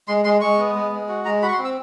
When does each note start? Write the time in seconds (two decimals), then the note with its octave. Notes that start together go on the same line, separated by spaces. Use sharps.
0.08 G#3 C6
0.25 G#3 C6
0.41 G#3 C#6
0.58 B3
0.75 G#3
0.92 G#3
1.09 F#4
1.25 G#3 A#5
1.42 F#4 B5
1.48 C#6
1.53 C6
1.59 C4
1.65 E6